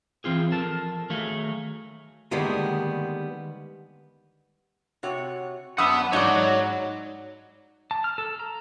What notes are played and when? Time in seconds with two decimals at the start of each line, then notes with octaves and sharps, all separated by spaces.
0.24 E3 C4 F4 G#4
0.52 F3 A4 A#4 A5
1.10 D#3 F#3 A3 G#4 A4 F5
2.31 D3 D#3 G3 G#3 A#3 B3
5.03 C3 F#4 C#5
5.78 F#2 D4 F#5 B5 D#6 E6
6.13 G#2 D#4 C#5 D5 F#5
7.91 A5
8.04 F6
8.18 A4
8.40 A#5